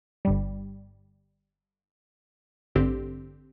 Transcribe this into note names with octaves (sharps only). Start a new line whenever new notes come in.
G1 G2 G3
A1 G2 D3 C4 G4